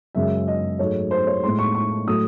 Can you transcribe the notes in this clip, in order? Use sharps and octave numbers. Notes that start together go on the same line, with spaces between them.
F#2 C#3 G#3 E5
D#5
G#2 F#3 A3 C#5
C5
C#5
A2 G#3 C6
C#6
C#6
A2 F#3 A3 D#6